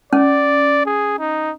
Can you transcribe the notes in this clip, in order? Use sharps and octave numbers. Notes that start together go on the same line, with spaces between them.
C#4 D5
G#4
D#4